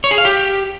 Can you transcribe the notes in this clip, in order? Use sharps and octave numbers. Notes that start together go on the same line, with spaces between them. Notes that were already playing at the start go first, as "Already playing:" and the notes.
C#5
G#4
F5
G4